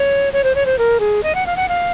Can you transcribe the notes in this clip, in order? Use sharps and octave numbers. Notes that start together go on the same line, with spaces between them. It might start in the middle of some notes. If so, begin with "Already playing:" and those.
Already playing: C#5
C#5
C5
C#5
C5
A#4
G#4
D#5
F#5
F5
F#5
F5